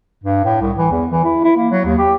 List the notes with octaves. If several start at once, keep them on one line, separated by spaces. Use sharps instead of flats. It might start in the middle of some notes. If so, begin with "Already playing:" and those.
G2
A2
C2
E3
E2
E3
E4
E4
A#3
F#3
D#2
G4